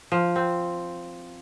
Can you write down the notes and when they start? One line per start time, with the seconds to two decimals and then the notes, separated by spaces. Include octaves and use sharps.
0.12 F3
0.36 C4